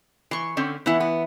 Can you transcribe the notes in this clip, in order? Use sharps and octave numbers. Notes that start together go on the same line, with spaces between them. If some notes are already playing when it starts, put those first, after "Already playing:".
E3 C6 C#6
D3 C4 C#4
E3 B3 E4 F#5
B3